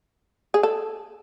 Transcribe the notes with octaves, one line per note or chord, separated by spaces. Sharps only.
G#4
A4